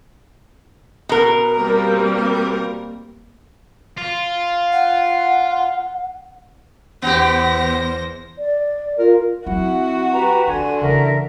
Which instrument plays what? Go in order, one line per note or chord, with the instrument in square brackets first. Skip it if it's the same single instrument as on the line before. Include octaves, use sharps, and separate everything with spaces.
[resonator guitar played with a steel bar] B2 A#4
[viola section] G3 A#3 C4
[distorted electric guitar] F4
[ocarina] F#5
[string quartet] E2 C5 A#6 [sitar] B3 G4
[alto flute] D5
[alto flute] F4 [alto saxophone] A#4
[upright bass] F#3 C4 [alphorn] E4 [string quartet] F#4 [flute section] F#5
[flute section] G4 B4 A#5
[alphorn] D3 [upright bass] D4 [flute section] G#5 C6
[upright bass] C#3 E3 [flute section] A#4 E5